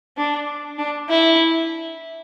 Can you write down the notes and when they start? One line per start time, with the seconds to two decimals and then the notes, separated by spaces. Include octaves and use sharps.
0.17 D4
0.78 D4
1.10 E4